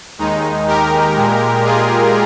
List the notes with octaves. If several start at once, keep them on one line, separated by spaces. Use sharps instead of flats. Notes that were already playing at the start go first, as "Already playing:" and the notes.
D#2 D#3 G#3 D#4
G4 A#4
A#2 G#3
F4 G#4